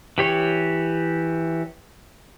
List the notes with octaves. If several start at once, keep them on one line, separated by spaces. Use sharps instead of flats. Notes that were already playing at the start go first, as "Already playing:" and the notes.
E3 G4 C#5